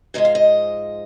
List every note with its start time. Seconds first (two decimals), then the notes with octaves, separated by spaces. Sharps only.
0.14 G#2 F3 G#3 D#5
0.25 F5
0.35 D#5